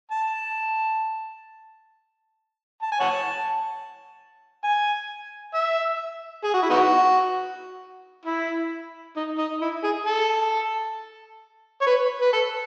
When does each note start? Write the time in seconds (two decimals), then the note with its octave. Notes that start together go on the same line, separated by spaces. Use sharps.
0.11 A5
2.82 A5
2.92 G#5
3.00 C#5 F#5 A5
4.64 G#5
5.54 E5
6.44 G#4
6.54 F#4
6.62 E4
6.70 B3 D#4 F#4
8.25 E4
9.16 D#4
9.38 D#4
9.61 E4
9.84 G#4
10.06 A4
11.81 C#5
11.87 B4
12.21 B4
12.33 A4